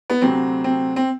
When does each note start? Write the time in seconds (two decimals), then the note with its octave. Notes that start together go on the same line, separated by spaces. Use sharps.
0.10 B3
0.22 D2 C3 F#3 C4
0.64 C4
0.96 C4